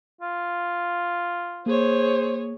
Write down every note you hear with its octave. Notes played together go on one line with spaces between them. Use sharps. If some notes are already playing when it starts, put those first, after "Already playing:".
F4
A#3 G#4 C5 C#5